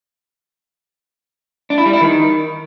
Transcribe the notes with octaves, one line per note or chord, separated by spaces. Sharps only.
D4
E4
G3
E4
D#3